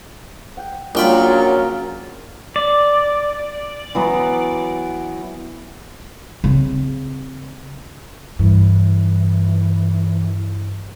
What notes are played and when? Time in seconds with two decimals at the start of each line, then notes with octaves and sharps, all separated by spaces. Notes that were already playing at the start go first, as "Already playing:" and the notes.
0.57 F#5 G5
0.95 A#1 C#3 F#3 F4 A#4 G5 B5
2.56 D5
3.95 E3 F#3 B3
6.44 C#3 C4
8.39 G2 E3